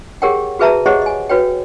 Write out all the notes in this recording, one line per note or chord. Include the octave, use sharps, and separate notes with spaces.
G4 G#4 A#4 C#5 F#5 G5
F#4 G#4 B4 E5 A5 A#5
G4 G#4 C5 C#5 D#5 F#5
D#5 G#5
F#4 B4 C#5 G5